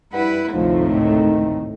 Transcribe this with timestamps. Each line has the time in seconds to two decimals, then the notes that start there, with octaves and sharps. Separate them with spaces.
0.13 G2 E4 B4 F#5
0.54 G#1 D2 A2 C3 F3 A3 D#4
0.91 D#3